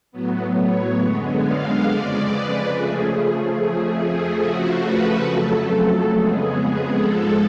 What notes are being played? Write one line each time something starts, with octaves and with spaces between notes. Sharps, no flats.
A2 F#3 B3
C#5
F#2 D3 G#3 B3
F5
F2 C#3 G#3 D5
B4
C#3 F3 A3 G#4
F2 F3 A3 G#4
C#3 F3 A3 F#4
B4
F2 C#3 F#3 A3 A4
F2 C#3 G#3 B3 G#4
G#2 F3 G#3 A4